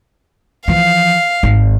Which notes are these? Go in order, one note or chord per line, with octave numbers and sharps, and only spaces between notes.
E3 F3 F5
G#1